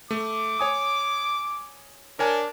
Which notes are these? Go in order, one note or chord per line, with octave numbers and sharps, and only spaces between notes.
A3 D6
C#5 G#5 D#6
D4 A#4 C#5 G#5